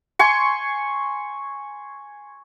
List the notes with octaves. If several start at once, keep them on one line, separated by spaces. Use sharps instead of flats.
G#5 C6 C#6